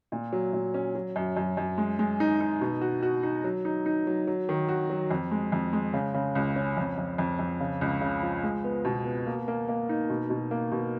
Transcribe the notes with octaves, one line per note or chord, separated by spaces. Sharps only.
A#2
F#3
A#2
C#4
F#3
F#2
F#2
F#2
G#3
G#3
D#4
D#4
B2
F#4
F#4
D#4
F#3
D#4
D#4
F#3
F#3
D#3
F#4
F#3
F2
G#3
F2
G#3
C#3
C#3
C#2
C#4
F2
F2
F2
F2
C#3
C#2
C#3
F3
G#3
B3
B2
B3
A#3
A#3
A#3
D#4
B2
B2
A#3
B2